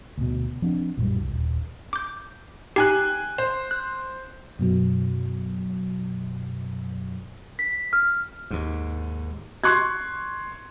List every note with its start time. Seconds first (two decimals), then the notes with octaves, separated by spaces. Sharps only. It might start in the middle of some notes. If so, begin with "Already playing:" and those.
0.18 D2 B2
0.62 F3 C4 D4
0.97 A#1 F#2 F3 G3
1.20 C2
1.33 D#1
1.93 D6 G6
2.76 D#4 G4 G5 G#5 F#6
3.38 C5
3.71 F#6
4.59 F#2 B2 F#3
7.59 B6
7.93 F6
8.51 D#2 G#2
9.64 C6 C#6 F#6 G#6